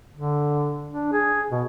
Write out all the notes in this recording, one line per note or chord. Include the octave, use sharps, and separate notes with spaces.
D3
D4
G#4
B2